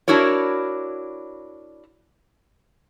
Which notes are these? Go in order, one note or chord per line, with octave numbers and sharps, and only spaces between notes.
D4 E4 F#4 A#4 C#5